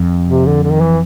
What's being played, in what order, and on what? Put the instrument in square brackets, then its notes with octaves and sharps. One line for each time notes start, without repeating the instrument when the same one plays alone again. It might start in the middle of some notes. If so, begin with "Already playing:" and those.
Already playing: [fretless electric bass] F2
[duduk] C3
D3
D3
D#3
E3